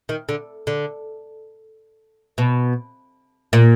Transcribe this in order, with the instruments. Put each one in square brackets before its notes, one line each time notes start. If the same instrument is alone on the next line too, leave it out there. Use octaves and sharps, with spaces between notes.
[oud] D#3
D3
D3
B2
A#2